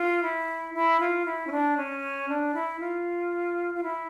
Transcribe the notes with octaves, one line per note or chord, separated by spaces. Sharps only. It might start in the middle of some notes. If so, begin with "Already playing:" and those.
Already playing: F4
E4
E4
F4
E4
C#4
D4
C#4
D4
E4
F4
F4
E4